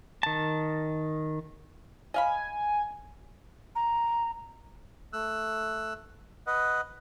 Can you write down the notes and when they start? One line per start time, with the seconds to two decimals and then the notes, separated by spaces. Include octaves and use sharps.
0.23 D#3 A5
2.14 D#5 F5 G#5 B5
3.75 A#5
5.13 A3 E6 F#6
6.47 B4 D#5 F#5